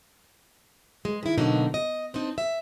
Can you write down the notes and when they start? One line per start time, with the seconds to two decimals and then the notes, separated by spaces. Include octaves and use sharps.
1.05 G#3
1.23 D#3 E4
1.38 B2 D3 F#3 A#3 D#4
1.74 D#5
2.14 C4 D4 D#4
2.38 E5